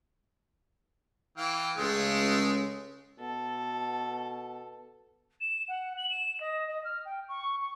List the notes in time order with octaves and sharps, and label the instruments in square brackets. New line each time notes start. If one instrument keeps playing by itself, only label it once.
[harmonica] E3 F5 G5
[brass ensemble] C#2 C#3 [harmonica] G#3 A3
[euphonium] B2 [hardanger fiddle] A4
[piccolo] E7
F#5
F#7
E7
D#5
D#5
F6
G5
C#6
C#6